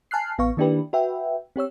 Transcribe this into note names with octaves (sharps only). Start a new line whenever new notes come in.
G#5 A5 F6 F#6 C7
A1 B3 F5 C#6
D#3 A#3 D4 E4 G4 B4
F#4 B4 E5 G5
C4 G4 C#5 E6